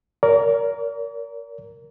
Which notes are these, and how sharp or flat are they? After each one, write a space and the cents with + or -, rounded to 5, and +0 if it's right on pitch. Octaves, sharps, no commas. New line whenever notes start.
A#4 +0 D5 -45